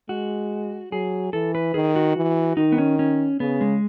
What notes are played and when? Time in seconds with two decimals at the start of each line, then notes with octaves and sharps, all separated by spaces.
0.09 G#3 F#4
0.92 F#3 G#4
1.33 E3 A4
1.55 B4
1.74 D#3 G#4
1.96 F#4
2.16 E3
2.57 D#3 D#4
2.72 B3
2.78 C#4
2.99 C#4
3.40 C#3 B3
3.61 G#3